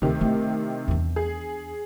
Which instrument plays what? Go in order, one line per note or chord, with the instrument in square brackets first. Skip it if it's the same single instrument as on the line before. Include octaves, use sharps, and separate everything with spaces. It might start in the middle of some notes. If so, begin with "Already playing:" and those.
[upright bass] D2 [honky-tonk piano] C3 D#3
[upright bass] A3 E4
E2 D4
[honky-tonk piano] G#4